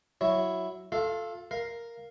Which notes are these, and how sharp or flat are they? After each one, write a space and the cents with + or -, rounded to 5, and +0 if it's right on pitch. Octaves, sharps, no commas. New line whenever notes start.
F#3 +0 E4 +0 C#5 +0
F4 +30 A4 +0 F5 -25
A#4 +0 F5 +0